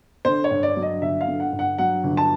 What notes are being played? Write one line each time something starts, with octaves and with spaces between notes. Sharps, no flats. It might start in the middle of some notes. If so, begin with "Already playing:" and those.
D3 C5
C#5
G2
D5
F#3
D#5
G1 E5
F5
D3
F#5
G2
F#5
F#3 F#5
G1
A5